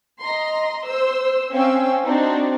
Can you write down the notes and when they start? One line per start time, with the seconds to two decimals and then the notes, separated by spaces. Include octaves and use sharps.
0.20 D#5 A#5 C6
0.84 C5 E6
1.52 C4 C#4 F5 G5 E6
2.03 C4 D4 D#4 F#4 C5